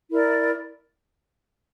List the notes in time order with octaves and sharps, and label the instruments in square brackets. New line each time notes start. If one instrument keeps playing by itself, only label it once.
[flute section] E4 A#4 D5